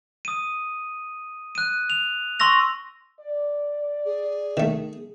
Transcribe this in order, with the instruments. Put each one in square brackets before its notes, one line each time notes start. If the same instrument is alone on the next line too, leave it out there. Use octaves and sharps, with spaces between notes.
[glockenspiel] D#6 D#7
F#6 D#7
F7
C6 C#6 E6 A#6 F7
[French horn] D5
[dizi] G#4
[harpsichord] D#3 A3